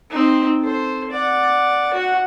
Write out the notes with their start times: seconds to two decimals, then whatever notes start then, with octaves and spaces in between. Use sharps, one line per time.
0.10 C4 D#4
0.60 A4 C5
1.10 D5 F#5
1.93 F#4 F#5